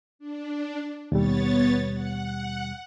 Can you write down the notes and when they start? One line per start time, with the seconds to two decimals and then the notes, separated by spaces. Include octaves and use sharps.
0.19 D4
1.12 D#2 B2 G3 B3 C#5 A6
1.89 F#5